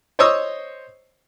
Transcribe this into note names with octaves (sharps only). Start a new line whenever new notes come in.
C5 C#5 D#5 C#6 D#6 E6